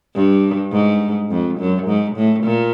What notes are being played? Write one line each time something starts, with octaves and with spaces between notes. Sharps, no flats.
G2
G#2
F2
F#2
G#2
A2
A#2